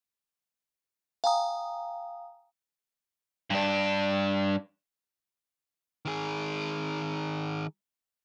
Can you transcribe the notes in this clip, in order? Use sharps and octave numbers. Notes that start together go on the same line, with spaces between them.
F5 G5 G#5 A#5 D#6
G2 D4
D#3 G#4